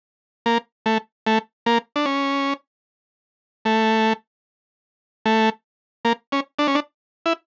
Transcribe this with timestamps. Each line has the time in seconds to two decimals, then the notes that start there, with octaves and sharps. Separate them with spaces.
0.46 A#3
0.86 A3
1.27 A3
1.66 A#3
1.96 D4
2.06 C#4
3.65 A3
5.26 A3
6.05 A#3
6.32 C#4
6.59 D4
6.68 C#4
6.75 D4
7.26 E4